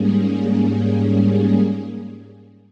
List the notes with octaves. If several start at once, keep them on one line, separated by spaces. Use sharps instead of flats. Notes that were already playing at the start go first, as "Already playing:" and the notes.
Already playing: G#2 G3 A#3 C#4 G#4